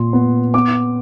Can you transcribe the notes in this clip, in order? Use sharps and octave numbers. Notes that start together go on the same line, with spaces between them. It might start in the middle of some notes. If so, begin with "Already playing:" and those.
Already playing: A#2 C6
B3
B3 D6